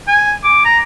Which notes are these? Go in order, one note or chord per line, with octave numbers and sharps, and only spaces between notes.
G#5
D6
A#5